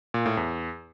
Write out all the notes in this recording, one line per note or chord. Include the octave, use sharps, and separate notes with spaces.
A#2
A2
E2